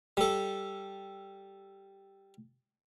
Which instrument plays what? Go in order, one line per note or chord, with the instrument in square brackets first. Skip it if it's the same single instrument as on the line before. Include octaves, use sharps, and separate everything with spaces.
[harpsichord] G3 A4